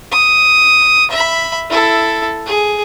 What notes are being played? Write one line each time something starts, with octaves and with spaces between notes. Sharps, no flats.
D#6
E5 B5
E4 A4
G#4